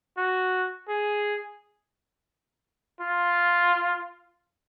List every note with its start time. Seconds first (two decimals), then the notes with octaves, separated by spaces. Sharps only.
0.18 F#4
0.89 G#4
3.01 F4